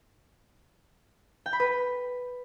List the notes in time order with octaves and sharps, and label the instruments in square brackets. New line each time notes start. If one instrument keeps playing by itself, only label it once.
[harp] G5
B5
B4